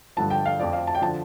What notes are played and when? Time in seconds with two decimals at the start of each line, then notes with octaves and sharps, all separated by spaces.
0.16 G2 D3 F3 A5
0.30 G5
0.46 F5
0.59 F2 F3 D5
0.73 F5
0.87 A5
0.95 G5
1.02 D3 F3 A5